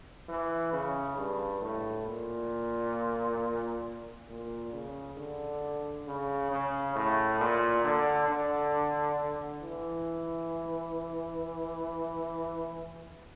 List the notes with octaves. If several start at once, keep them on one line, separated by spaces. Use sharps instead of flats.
E3
C#3
G2
A2
A#2
A#2
C#3
D3
C#3
C#3
A2
A#2
D3
D3
E3